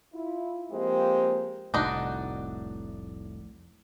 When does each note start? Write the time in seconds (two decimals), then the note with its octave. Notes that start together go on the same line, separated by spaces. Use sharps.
0.14 E4 F4
0.71 F3 G#3 A#3 C4 G4
1.74 F1 C2 A2 D4 D#4 F#4